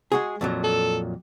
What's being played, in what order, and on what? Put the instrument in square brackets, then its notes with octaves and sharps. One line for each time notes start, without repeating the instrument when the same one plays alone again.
[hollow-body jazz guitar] G#3 F#4 G#4
F2 A#2 F#3
[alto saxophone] A4